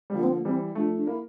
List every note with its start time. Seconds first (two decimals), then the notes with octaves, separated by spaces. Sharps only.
0.10 G3
0.14 D3 F3 A#3
0.23 C4
0.32 A#3
0.45 E3 G3 C4
0.75 F3 A3 D4
0.96 D4
1.07 A#3 E4